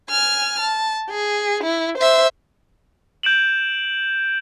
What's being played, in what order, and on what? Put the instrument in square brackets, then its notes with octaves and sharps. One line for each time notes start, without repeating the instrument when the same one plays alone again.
[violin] G#5 F6
A5
G#4
E4
C5 E5
[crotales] G6 D7 E7 F#7